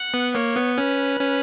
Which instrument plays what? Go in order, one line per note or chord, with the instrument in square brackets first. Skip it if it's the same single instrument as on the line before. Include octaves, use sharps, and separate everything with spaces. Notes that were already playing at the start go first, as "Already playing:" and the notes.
Already playing: [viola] F#5
[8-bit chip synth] B3
[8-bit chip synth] A#3 [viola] C#5
[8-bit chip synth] B3
[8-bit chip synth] C#4 [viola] B4
[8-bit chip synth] C#4